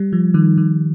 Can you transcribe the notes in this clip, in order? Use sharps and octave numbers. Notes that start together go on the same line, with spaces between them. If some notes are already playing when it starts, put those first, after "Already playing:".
Already playing: G3
F3
D#3
D#3